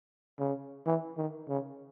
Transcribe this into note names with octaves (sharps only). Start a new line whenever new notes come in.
C#3
E3
D#3
C#3